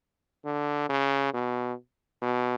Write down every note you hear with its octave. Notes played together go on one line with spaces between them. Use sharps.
D3
C#3
B2
B2